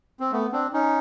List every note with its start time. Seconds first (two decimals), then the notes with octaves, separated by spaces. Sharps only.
0.20 C4
0.32 A3 B3
0.52 C4 D4
0.73 C#4 D#4